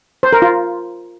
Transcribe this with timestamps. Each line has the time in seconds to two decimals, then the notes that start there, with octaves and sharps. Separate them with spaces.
0.23 C5
0.33 A#4
0.42 F4